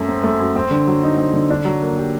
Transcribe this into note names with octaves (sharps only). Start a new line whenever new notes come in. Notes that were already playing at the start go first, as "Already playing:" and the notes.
Already playing: F#2 F#3 A3
C4
A3
F#2
C4
D3
F#3
D#4
C4
D3
D4
F#3
A#3
G4